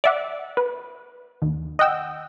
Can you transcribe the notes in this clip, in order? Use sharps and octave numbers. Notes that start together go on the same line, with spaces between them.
D5 E5 F#5
B4
D#2
D#5 F#5 G5 E6